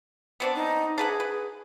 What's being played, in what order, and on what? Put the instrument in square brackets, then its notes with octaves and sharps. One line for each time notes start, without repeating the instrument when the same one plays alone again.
[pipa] B3 C4 D4
[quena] D#4
[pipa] D4 B4 F#5 [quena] G#4
[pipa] B4